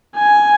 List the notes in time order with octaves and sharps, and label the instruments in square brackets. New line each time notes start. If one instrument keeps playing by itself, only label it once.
[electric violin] G#5